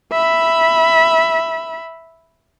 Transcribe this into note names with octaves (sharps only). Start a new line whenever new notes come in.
E5 B5